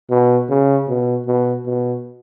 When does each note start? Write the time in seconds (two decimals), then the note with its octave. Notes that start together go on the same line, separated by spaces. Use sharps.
0.10 B2
0.50 C#3
0.88 B2
1.27 B2
1.66 B2